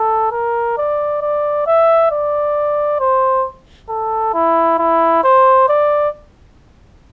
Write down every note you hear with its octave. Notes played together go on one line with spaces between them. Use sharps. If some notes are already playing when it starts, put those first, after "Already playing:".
Already playing: A4
A#4
D5
D5
E5
D5
C5
A4
E4
E4
C5
D5